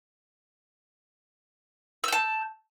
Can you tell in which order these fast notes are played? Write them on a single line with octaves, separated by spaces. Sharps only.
E6 G6 A5